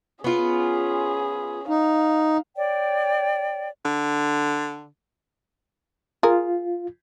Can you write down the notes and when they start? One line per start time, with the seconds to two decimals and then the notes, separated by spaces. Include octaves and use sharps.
0.24 B3 C#4 F4 G#4
1.69 D#4 F5
2.56 C#5 D5 G5
3.85 D3
6.23 F4 G#4 A#4